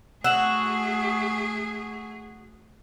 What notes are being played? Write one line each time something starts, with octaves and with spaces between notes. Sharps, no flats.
A3 F#4 G#4 E6 E7 F#7